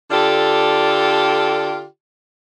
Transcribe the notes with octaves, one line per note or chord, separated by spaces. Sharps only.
D3 F4 G4 A4 D5